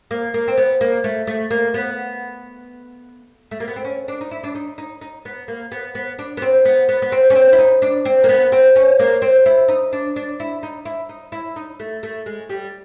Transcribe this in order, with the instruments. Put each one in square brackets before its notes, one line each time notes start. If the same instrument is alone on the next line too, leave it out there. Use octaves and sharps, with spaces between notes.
[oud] A#3
A#3
C4
B3
A#3
A3
A3
A#3
B3
A3
A#3
B3
C4
C#4
D4
D#4
E4
D4
D#4
D#4
D#4
B3
A#3
B3
B3
D4
B3
C4
B3
B3
B3
C4
C#4
C4
E4
D#4
D4
C4
A#3
B3
C4
C#4
A#3
C4
E4
D#4
D4
D4
E4
D#4
E4
D#4
E4
D#4
A3
A3
G#3
G3